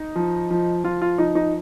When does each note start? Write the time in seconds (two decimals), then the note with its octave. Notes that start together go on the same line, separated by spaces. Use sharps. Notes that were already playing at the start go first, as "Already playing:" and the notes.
Already playing: D#4
0.16 F3
0.50 F3
0.84 F3 F4
1.02 F4
1.18 F3 D#4
1.35 D#4